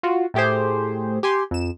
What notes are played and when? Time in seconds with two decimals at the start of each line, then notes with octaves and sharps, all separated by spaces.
0.03 F4 F#4
0.34 A2 A3 G4 G#4 C5
1.23 G4 G#5 C6
1.51 F2 E7